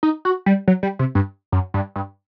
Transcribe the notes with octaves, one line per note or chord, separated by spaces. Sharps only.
D#4
F#4
G3
F#3
G3
C3
G2
F#2
G2
G2